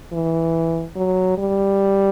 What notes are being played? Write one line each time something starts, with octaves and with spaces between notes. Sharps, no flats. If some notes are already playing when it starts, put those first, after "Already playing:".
E3
F#3
G3